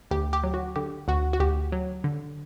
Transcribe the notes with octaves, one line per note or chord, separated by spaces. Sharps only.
D2 G4
G4
F#3
F#4
D3 G4
D2 F#4
F#4
D2 G4
F#3
D3